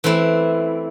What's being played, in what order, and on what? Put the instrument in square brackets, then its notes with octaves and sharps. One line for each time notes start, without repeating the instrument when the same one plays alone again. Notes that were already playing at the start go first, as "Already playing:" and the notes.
[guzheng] E3 A3 C4 E4